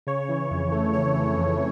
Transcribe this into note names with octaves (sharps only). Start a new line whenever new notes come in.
C#3 C#5
E3
F2
A3
C#3 C#5
E3
F2